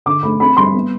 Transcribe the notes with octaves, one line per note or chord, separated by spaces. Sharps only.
D3 D6
A3 B5
C4 B5
G3 C6
B3